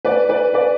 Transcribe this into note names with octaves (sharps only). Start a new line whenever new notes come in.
B4 D5
B4 D5
B4 D5